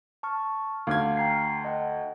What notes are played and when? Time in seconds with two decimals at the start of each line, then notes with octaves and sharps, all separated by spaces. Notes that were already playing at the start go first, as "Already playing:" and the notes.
0.23 A5 C#6 F6
0.87 D2 F5 D6 F6 G#6
1.17 G5 A#5 C7
1.65 D#5 F#5 G5